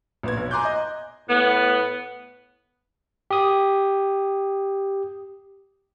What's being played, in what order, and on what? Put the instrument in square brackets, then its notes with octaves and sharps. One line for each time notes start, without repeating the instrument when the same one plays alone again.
[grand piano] A#1 B3 G#6
B1
G#5 A#5 C6 D6 F#6 G6
D#5
[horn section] A2 B3
[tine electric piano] G4 D#6